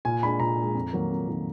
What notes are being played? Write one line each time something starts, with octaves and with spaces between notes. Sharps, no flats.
A#2 G#5
G#3 D4 B5
A#2 A#5
G#3 D4
F2
D#3 F#3 A#3
F2
D#3 F#3 A#3